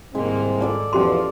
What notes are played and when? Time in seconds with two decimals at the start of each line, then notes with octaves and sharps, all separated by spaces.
0.15 C2 G#2 D#3 G#3 A#3 C4
0.60 A4 D5 A5
0.93 E2 B2 F3 C#4 G4 C6